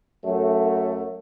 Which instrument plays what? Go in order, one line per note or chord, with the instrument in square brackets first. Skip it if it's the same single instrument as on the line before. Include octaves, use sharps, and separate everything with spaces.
[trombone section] F#2 F#3 A3